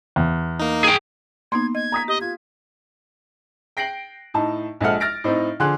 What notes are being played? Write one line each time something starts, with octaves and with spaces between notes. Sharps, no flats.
E2
A#3 D#4
G#4 G5
A#3 B3 D#4 C6 G#6
D#5 G#6
A#5 D#6 B6
G4 D#5
F4 G#6
G5 A#6 C7 D7 F#7
A2 D#4 A5
A#1 F3 G#3 A4 F#5 F6
F6 A6 A#6 D7
A2 C4 D#4
D3 F3 G#4 C6 F#6